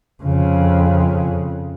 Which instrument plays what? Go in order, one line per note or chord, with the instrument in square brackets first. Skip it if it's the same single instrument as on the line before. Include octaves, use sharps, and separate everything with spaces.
[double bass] F2 C#3